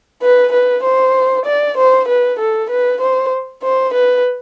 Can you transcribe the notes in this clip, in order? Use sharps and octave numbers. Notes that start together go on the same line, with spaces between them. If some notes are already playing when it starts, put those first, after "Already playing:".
B4
B4
C5
D5
C5
B4
A4
B4
C5
C5
B4